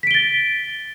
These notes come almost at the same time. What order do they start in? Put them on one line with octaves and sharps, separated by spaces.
B6 D7 G7 A6